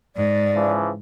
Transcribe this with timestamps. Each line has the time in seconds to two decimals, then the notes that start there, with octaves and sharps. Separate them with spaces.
0.16 G#2 D5
0.54 C#3 E3 F3